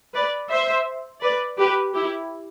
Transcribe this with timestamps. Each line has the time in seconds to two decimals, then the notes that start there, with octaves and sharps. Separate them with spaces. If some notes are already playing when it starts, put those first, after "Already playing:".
0.14 B4 D5
0.50 C5 E5
1.22 B4 D5
1.58 G4 B4
1.94 E4 G4